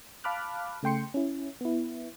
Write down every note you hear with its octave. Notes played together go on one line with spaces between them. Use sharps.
F5 A5 B5 D6 F6 F#6
C#3 A3 G5 C6 C#7
C#4 E4
B3 E4